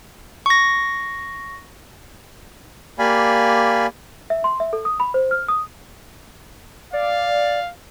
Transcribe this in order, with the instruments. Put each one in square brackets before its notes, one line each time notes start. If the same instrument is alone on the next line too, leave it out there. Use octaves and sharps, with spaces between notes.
[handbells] C#6 A#6
[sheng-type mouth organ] A#3 G4 D5 F5 G#5 B5
[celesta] E5
C6
E5
A4
D#6
B5
C5
F6
D#6
[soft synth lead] D5 [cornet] F5